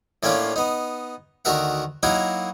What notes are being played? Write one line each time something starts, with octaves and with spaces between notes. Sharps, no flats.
A2 A3 A#3 C#4 D4 F4
B3 D#4
D2 D#3 F#4 A#4 E5 F#5
F#3 A#3 D#4 E4 F#4 A#4